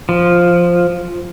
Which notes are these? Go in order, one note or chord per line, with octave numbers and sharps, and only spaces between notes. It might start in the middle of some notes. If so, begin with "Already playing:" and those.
F3